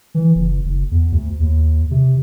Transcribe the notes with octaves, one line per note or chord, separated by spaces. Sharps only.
E3
F#1
F#1
E2
D2
D#2
C3